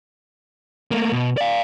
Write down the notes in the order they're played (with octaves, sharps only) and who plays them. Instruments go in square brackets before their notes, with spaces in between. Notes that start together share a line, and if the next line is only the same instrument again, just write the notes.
[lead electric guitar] A3 A#3
B2
D5 F5